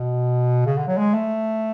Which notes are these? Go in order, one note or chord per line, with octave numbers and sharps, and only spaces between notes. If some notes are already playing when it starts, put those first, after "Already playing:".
Already playing: B2
C#3
D3
F#3
G#3
A3